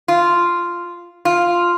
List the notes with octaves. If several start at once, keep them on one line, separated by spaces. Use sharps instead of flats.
F4
F4